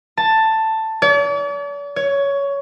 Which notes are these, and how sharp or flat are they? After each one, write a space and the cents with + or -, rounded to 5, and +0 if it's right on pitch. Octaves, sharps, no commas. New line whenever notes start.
A5 +10
D5 -45
C#5 +15